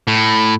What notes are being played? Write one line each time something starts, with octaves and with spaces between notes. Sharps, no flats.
A2